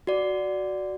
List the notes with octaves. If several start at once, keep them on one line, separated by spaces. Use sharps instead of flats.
F#4 D5